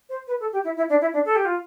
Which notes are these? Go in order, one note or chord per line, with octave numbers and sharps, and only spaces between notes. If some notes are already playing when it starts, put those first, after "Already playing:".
C5
B4
A4
G4
E4
E4
D4
E4
D4
A4
G4
F4